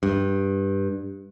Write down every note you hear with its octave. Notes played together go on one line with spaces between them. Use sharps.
G2